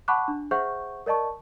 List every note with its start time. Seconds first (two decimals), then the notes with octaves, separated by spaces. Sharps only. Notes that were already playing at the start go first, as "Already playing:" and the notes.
0.08 F#5 A5 B5 C#6 D6 F#6
0.28 D4
0.51 G#4 C5 E5 F#5 C#6 G6
1.06 A#4 D5 D#5 A5 C#6